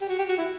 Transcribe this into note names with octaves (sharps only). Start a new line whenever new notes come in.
G4
F#4
G4
F#4
E4